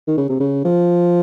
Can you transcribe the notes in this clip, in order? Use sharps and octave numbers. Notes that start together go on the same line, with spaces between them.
D#3
C#3
C3
C#3
F3